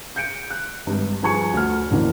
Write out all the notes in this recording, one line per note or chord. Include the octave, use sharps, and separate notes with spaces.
G6 C#7 D7
F#6
G#1 G2
G2 F3 G#4 G#5 C#6 C#7
D2 F6
F2 A2 D3 E3 A#3